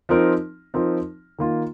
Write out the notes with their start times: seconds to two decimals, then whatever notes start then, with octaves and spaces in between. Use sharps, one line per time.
0.09 F3 C4 D#4 A#4
0.74 F3 C4 D#4 A#4
1.39 D#3 A#3 F4